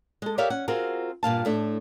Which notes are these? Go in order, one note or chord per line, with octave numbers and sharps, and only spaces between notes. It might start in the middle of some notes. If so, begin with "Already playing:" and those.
G#3 A4
G4 A#4 C#5 D5 E5 F5
C#4 F#5
C4 F4 F#4 G#4 A#4
G2 A#2 F5 A5
A2 A3 D4